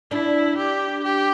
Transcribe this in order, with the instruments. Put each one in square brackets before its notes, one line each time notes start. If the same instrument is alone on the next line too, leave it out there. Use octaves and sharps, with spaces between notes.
[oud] D4 [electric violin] E4
[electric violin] G4
G4